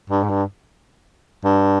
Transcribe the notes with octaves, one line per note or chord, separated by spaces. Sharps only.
G2
G#2
G2
G2